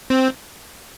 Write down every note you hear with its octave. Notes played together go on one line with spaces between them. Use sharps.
C4